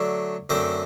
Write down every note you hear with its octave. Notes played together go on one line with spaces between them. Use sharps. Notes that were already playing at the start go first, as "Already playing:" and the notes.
Already playing: D3 F#3 A3 D4
F#2 D3 A3 C4 C5